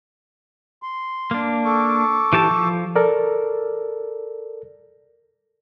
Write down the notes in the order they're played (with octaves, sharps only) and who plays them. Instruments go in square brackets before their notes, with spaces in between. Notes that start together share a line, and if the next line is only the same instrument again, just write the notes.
[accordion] C6
[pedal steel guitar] A#3 D4
[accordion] A4 C#6 D6
[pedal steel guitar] E3 G4 A5
F3
[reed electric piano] A4 A#4 D5